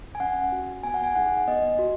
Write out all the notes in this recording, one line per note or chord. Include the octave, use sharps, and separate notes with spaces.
G#5
C#4 F#5
F#4
B3 G#5
F#5
G#5
D#4 G#4 F#5
B3 D#5
F#4